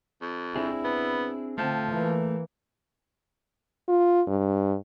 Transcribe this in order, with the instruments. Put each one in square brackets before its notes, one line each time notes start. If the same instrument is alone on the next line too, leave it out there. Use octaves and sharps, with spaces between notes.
[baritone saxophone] F2
[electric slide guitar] C4 D4 G#4 [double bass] E4
[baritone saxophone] B3
[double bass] D3 C4 [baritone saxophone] F3 [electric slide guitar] A3 A5
[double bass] E3 A#3
[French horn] F4
G2